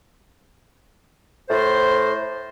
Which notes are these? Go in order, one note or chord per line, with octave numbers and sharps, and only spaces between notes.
A2 C5